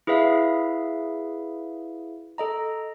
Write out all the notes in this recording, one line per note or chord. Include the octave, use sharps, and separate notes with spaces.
E4 G#4 B4 E5 F5
A4 D#5 A#5